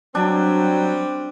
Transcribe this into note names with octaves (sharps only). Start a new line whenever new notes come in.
F#3 G3 C4 D4